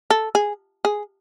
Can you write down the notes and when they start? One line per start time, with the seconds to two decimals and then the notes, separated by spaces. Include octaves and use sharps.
0.10 A4
0.35 G#4
0.85 G#4